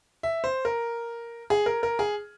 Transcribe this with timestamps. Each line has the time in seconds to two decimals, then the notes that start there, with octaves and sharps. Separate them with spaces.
0.23 E5
0.44 C5
0.65 A#4
1.50 G#4
1.66 A#4
1.83 A#4
1.99 G#4